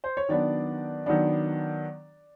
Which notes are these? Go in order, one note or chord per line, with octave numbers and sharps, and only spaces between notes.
C5
C#5
D#3 F#3 B3 D4 D5
D#3 F#3 B3 D4